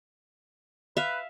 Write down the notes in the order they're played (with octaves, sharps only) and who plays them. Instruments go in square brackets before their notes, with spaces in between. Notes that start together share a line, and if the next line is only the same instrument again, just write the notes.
[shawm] B4 [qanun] E5 F5